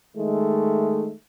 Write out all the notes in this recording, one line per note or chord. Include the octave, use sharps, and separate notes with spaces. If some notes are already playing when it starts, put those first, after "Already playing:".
D#3 G#3 A3